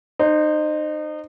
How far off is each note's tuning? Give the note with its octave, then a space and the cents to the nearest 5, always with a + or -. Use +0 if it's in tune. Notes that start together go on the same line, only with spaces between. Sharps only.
D#4 -30 C5 +0